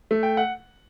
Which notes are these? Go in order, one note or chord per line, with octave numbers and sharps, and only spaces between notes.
A3
G5
F#5